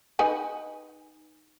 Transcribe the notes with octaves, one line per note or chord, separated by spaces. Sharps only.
D#4 B4 G#5